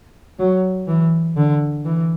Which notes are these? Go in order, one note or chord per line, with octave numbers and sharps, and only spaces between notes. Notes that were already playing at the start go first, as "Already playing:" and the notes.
F#3
E3
D3
E3